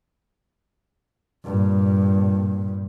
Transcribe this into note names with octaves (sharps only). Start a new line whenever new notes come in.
G2 A#2